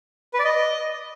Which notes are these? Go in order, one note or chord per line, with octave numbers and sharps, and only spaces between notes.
B4
D5
D#5